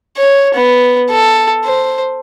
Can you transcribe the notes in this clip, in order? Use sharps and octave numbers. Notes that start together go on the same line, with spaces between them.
C#5
B3
A4
C5